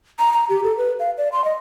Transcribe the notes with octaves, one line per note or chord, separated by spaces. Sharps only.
A#5
A#5
G4
A4
B4
F5
D5
C6
D#5